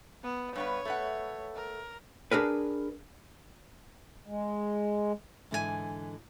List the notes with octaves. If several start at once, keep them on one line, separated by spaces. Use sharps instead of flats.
B3
G2 B3 B4 C#5
A3 B4 F#5
A#4
D4 G#4 A#4 B4
G#3
G#2 D3 E3 D4 A#4 G#5